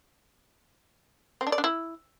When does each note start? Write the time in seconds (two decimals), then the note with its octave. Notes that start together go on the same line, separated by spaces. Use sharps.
1.41 C4
1.47 D4
1.52 D5
1.58 D4
1.64 E4